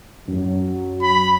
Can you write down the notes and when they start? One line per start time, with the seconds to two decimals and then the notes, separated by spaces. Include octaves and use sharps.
0.28 F#2 F#3
1.03 B5